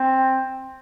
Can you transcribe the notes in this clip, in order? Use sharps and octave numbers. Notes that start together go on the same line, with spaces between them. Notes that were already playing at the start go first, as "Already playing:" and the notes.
Already playing: C4